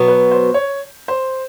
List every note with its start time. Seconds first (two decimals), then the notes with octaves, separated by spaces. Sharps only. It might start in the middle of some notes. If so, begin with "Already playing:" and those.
Already playing: B2 F#3 B3
0.08 B4
0.31 C5
0.54 C#5
1.08 C5